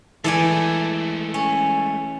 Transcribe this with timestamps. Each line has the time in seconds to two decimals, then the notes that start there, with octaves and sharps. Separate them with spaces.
0.24 E3 G#3 A3 A4 D5 G#5
1.34 C#4